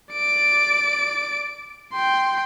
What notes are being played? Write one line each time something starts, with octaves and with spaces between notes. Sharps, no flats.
D5 D7
G5 C6